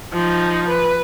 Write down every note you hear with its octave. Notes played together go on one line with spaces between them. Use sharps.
F3 D#4
B4